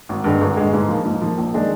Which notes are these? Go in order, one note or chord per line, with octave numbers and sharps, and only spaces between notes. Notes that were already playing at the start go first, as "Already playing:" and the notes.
G#1
G2 D3 G#3
G#1
G2 D3 G#3
G#2
F3 A#3
G#2
F3 A#3
A#1
D#3 G#3 D4